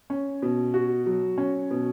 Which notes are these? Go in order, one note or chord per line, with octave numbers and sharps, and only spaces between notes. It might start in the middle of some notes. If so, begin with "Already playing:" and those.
C#4
B2
F#4
F#3
C#4
B2